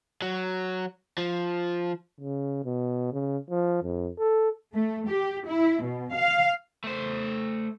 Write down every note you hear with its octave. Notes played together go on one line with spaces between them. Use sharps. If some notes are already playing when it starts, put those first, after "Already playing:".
F#3
F3
C#3
B2
C#3
F3
F2
A4
A3
G4
E4
B2
F5
A3 C5